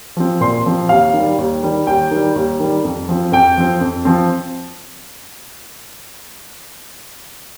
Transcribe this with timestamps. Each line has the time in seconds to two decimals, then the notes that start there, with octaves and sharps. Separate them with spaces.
0.17 F3 C4
0.41 A#2 C6
0.66 F3 C4
0.89 D#2 F5
1.14 D#3
1.19 G3
1.38 D#2
1.63 D#3 G3
1.87 D#2 G5
2.11 D#3 G3
2.36 D#2
2.60 D#3 G3
2.84 F2
3.09 F3 C4
3.32 F2 G5
3.57 F3 C4
3.81 F2
4.05 F3 C4